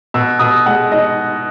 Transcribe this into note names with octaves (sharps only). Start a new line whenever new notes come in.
B2 E6
B2 D#6
G#3 F#5
D#4 D#5